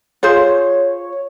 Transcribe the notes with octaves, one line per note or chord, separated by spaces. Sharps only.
F4 G#4 C5 C#5